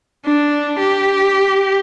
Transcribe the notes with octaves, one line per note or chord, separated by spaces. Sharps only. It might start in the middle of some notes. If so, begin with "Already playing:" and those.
D4
G4